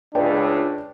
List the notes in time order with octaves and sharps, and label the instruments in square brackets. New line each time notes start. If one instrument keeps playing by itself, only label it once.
[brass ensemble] C#2 A2 [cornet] D4 [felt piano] B4 D5 G5